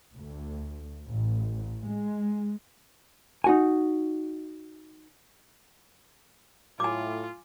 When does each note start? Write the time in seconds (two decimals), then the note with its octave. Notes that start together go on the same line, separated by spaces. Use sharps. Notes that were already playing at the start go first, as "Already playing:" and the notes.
0.15 D2
1.09 A1
1.89 G#3
3.44 D#4 F#4 G#5
6.80 A2 F4 G#5 D6